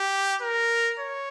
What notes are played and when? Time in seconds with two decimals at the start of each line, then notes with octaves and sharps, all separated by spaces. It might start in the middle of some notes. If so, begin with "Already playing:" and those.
Already playing: G4
0.41 A#4
0.99 C#5